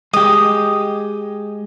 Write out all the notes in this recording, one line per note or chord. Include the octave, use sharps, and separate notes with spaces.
G#3 G4 D#6